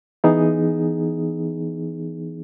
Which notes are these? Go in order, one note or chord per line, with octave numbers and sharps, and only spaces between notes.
E3 B3 D#4 G#4